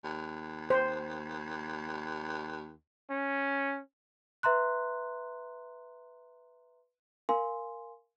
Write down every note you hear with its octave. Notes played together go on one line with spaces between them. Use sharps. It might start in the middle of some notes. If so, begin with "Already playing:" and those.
D#2
C5
C#4
B4 E5 A#5 C6 F#6
A#4 F5 G#5 C6